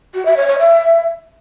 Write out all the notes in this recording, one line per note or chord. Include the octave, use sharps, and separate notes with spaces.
F#4
E5
C#5
C#5
E5